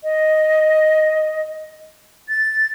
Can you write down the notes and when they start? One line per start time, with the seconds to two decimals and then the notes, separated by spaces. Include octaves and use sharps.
0.04 D#5
2.29 A6